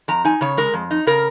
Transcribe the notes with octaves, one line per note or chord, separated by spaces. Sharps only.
F2 A#5
D#4 G#5
C#3 C#5
G#3 A#4
F2
D#4
C#3 A#4